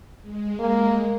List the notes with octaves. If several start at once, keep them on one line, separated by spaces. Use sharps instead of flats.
G#3
A#3